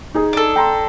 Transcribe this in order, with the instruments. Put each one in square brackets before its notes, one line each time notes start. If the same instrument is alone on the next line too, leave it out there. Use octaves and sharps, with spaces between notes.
[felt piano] D#4 G#4
[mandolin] D4 A4
[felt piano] G5 A#5 C6